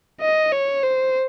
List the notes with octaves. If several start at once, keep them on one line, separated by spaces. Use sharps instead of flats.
D#5
C#5
C5